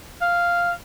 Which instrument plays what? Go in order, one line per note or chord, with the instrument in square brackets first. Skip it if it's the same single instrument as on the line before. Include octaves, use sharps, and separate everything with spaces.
[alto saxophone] F5